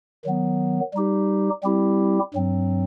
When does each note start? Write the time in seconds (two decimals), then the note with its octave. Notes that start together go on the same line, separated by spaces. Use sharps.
0.24 D#3 F#3 B3
0.94 G3 D#4 G4
1.63 G3 C4 E4 G4
2.34 G2 F#3 C4